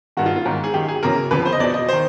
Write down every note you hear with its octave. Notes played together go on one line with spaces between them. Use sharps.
G2 D#3 F#4
F4
F4
G#2 D#3
G#4
F#2 D#3 G4
G#4
F#2 C#3 E3 A#4
F2 D3 F3 B4
C5
D#5
E2 B2 D5
D#5
D#3 C5